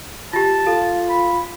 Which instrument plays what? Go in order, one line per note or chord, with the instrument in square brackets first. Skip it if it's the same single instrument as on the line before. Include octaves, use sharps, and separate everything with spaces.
[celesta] F4 G4 [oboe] A5
[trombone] F4 [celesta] A4
[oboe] B5